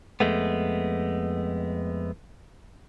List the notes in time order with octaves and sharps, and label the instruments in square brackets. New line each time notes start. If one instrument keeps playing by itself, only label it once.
[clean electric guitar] F2 G#3 A3 B3